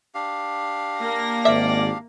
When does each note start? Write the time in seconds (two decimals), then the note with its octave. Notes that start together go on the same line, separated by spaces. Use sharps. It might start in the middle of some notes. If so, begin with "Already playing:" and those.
0.15 D4 G4 F5
0.99 A#3 A#6
1.45 G#1 D5 E5